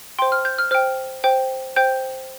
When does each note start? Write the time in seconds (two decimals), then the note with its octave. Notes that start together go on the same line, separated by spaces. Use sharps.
0.19 C5 G5 C6
0.32 F6
0.45 G6
0.58 F6
0.71 C5 G5 F6
1.24 C5 G5
1.76 C5 G5 G6